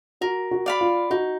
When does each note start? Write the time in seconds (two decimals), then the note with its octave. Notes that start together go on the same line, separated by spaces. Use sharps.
0.21 F#4 A#4
0.51 F#4
0.66 D5 F5 B5
0.81 F4
1.11 D#4 F#4